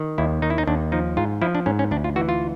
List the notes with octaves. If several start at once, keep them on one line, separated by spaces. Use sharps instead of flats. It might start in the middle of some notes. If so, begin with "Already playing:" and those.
Already playing: D#3
D#2 E4
D#3 D#4
E4
D#4
D#2 D4
F3 D#4
G#2 F4
F3 E4
D4
G#2 C#4
C#4
D2 D4
F4
E3 F#4
F4